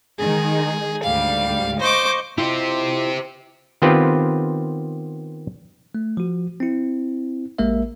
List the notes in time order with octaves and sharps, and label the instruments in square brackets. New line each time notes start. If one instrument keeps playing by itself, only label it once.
[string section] D#3 G#3 D#4 [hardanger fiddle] G#4
[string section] D2 G#2 G3 [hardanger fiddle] F5
[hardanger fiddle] C5 D6 [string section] D#5 C#6 G6
[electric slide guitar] E4 F4 D#5 [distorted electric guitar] G4 C5
[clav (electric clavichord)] D#3 B3 C4 F4 G4 B4
[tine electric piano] A3
F3 F#4
C4 E4
A1 G#3 A#3 A#4 E5